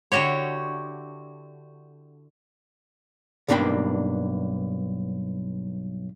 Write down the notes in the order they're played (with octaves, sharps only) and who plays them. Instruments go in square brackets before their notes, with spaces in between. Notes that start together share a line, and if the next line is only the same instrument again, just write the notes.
[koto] D3 E4 F#4 G4 C#5
[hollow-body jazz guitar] B1 G2 A#3 D4 G5 B5